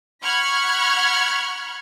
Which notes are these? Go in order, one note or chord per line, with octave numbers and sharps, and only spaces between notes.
F#5 B5 C#6 F6 F#6 G#6